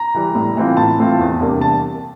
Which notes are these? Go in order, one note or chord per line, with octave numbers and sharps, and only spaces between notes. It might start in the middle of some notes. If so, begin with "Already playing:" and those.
Already playing: A#5
E3 G3
A2
E3 A3 C4 F4
A2 A5
E3 A3 C4 F4
E2
C3 G3 A#3 D4
A5